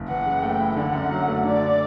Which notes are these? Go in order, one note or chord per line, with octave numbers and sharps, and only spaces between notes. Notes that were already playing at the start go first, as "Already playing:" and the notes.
Already playing: F#1
E3 F#5
C#3
A3 G5
E4
D3 F#5
F#2
F#3
A3
D3 D5